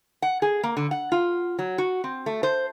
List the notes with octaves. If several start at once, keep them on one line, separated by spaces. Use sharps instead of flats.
F#5
G#4
A#3
D3
F#5
F4
F#3
F#4
C4
A3
C5